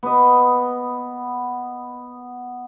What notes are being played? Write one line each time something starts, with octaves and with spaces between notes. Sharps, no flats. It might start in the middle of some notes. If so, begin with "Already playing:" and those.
B3 D#5